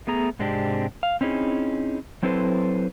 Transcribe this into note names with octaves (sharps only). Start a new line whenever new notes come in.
A3 B3 G#4 A#5
G#2 C3 G#3 C4 D4 G4
F5
C4 C#4 D#4 E4 G#4
F#3 C4 E4 A4 B4 C5